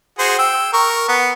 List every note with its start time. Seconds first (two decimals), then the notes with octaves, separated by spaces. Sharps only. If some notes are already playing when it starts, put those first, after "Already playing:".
0.19 F#4 G#4 C5
0.39 G5 E6
0.73 A#4 C#6
1.08 B3